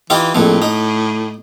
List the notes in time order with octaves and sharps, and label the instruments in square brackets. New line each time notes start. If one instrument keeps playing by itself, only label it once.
[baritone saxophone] E3 [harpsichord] D#4 F4 G4
[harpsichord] A#1 F2 F3 [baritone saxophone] A2
[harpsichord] D#4